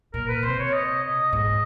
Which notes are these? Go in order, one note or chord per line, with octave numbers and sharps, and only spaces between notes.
A#2 A#4
B4
C3 C5
C#5
D#5
D#5
G#2 D#5